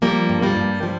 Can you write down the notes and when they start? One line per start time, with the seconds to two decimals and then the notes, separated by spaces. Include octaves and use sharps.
0.02 F3 G3 A#3
0.29 G2
0.42 G3 A#3
0.56 G2
0.83 F3 G3